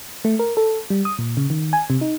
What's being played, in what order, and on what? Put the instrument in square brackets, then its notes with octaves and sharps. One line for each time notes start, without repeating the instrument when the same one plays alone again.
[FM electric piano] A3
A#4
A4
G3
D#6
A#2
C#3
D#3
G#5
C3
D#4